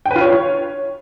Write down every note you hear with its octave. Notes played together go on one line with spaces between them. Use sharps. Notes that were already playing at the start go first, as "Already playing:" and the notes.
G5
B4
F4
C#5